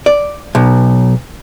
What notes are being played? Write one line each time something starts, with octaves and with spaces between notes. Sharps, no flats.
D5
B1